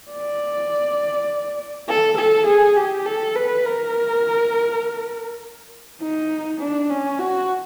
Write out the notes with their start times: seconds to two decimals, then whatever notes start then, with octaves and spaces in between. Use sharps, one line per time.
0.11 D5
1.88 A4
2.17 A4
2.46 G#4
2.76 G4
3.06 A4
3.35 B4
3.65 A#4
6.01 D#4
6.60 D4
6.90 C#4
7.19 F#4